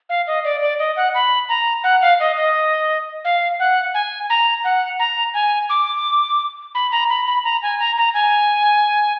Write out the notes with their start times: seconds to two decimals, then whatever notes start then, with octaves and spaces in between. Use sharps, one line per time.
0.09 F5
0.27 D#5
0.44 D5
0.62 D5
0.79 D#5
0.97 F#5
1.14 B5
1.49 A#5
1.84 F#5
2.02 F5
2.20 D#5
2.37 D#5
3.25 F5
3.60 F#5
3.94 G#5
4.30 A#5
4.64 F#5
4.99 A#5
5.34 G#5
5.70 D6
6.75 B5
6.92 A#5
7.09 B5
7.27 B5
7.44 A#5
7.63 G#5
7.79 A#5
7.97 A#5
8.14 G#5